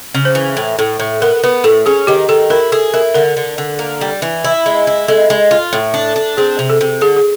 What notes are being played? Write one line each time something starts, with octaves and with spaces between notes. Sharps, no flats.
C#3
C5
E3
A2
A2
A2
B3 A#4
B3 B4
A2 A4
C#4 G#4
D#3 G4
D#3 A4
E4 A#4
G#4 A4
E4 A#4
D3 A#4
D3
D3
A#3
G3
E3
E4
G#3
E4
G#3 A4
G#3
F4
A2
D4
D4
C4 G#4
C3
A4
C3
D3 G#4
G#4